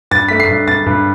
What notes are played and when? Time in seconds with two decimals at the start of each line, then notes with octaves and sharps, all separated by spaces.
0.11 G2 A6
0.28 A3 B6
0.40 C7
0.48 G2
0.67 G2 A6
0.86 G2